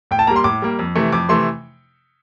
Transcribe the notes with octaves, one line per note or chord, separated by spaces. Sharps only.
A2 G5
A5
G3 A#3 A#5
C6
A2 D6
G3 A#3
F2
C3 E3 A3
F2 D6
C3 E3 A3 C6